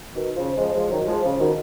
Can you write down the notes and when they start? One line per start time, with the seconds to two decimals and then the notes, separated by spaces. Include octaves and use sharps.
0.14 B2 D#3
0.36 C#3 F3
0.58 F3 G#3
0.74 F3 G#3
0.91 D#3 F#3
1.07 F3 G#3
1.23 C#3 F3
1.39 B2 D#3